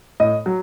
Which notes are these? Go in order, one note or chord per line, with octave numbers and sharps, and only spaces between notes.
A2 D#5
F#3